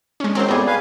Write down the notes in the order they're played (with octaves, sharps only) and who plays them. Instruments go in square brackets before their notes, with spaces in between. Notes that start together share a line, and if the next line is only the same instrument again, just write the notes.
[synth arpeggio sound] G#3 C#4
[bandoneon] D#3 F#3 [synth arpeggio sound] C4 C5
[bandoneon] F#2 A2 G3 [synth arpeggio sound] B3 G#4
[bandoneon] B4 F5 G#5